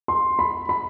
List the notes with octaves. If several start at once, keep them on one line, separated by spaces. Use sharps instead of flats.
C6
B5
B5